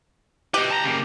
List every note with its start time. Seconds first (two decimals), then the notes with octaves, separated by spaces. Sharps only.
0.54 G4 B4 D#5
0.71 A5 A#5
0.84 C#3 A#3